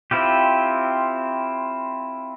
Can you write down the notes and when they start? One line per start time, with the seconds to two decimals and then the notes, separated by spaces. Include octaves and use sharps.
0.11 C4 E4 F4 G4